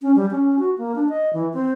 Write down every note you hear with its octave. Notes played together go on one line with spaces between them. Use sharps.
C#4
G3
C#4
F#4
A#3
D4
D#5
E3
C4